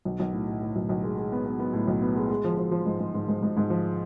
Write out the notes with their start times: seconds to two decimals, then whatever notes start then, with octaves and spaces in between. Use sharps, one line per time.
0.05 B1
0.20 B1
0.33 A2
0.48 A2
0.61 A2
0.76 B1
0.89 B1
1.04 G#3
1.18 G#3
1.32 B3
1.46 B3
1.59 B3
1.73 A2
1.87 B1
2.02 B3
2.16 G#3
2.29 G#3
2.44 F3
2.58 F3
2.72 F3
2.86 G#2
3.00 G#2
3.14 G#2
3.28 G#2
3.42 G#2
3.57 G#2
3.70 F3